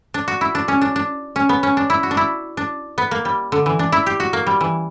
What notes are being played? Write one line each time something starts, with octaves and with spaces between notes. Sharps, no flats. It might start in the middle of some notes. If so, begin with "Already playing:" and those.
D4
F#4
E4
D4
C#4
D4
D4
C#4
B3
C#4
D4
E4
F#4
D4
E4
D4
B3
A#3
G3
D3
E3
D4
E4
G4
F#4
A#3
G3
E3